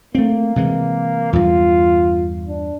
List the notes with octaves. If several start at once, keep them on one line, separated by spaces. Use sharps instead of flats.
A3 A#3 C4
C3 E3 G#3
E2 G2 F4
D4